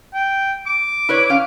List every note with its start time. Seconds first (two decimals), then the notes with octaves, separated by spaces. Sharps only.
0.14 G5
0.66 D6
1.09 E4 B4 C#5
1.30 C#4 F5